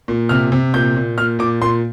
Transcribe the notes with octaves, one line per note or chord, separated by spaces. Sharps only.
A#2
C3 F6
C3
A#2 G6
A#2
A#2 F6
A#2 D6
A#2 C6